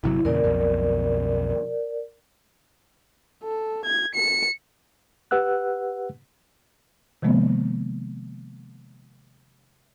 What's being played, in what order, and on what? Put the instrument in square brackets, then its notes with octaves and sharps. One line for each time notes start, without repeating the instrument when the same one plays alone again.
[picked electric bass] G1 C3 F#3 [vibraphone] E4
[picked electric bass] E2 A#2 C#3 [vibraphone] A#4 D5
[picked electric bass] B1 F2 B2
[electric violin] A4
G#6
C#7
[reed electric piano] G4 B4 F#5 E6 F#6
[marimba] C3 D#3 F3 G#3 A#3 B3